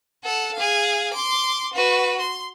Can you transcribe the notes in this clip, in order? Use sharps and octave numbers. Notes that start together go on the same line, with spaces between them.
A4 F#5
G#4 F5
C6 D6
F#4 B4
C6